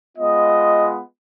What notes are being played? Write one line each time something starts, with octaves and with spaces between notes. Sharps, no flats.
G#3 B3 F4 D#5